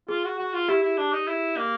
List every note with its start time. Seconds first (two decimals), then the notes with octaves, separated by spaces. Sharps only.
0.08 F4 G#4
0.24 F#4
0.38 F#4
0.53 F4
0.68 E4 G4
0.83 E4
0.97 D4
1.12 D#4
1.27 E4
1.57 A#3